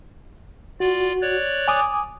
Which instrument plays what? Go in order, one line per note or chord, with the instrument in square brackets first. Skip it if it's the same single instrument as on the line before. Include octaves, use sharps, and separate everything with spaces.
[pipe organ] F4 D5 [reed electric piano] F#4
[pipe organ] C#5 D5 F#6
[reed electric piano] G#5 D6 D#6